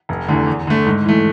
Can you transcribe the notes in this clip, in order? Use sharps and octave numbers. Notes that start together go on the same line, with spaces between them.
F1
E2 D3 A3
E2
D3 A3
G#2
E3 A3